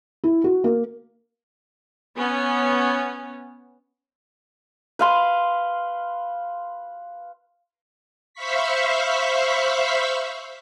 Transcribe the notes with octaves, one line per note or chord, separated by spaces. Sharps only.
E4
F#4
A#3
B3 C#4
B4 F5 C6
C5 E5 F5 B5 C#6 B6